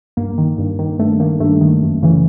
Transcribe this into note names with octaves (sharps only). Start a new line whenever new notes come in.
G2 A#3
D#3
G2
D#3
G2 A3
D#3 A#3
G2 A3
D#3
F#2
C#3 E3